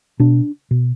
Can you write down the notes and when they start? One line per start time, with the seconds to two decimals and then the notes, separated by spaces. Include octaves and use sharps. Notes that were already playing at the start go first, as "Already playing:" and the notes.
0.20 B2 D4
0.71 B2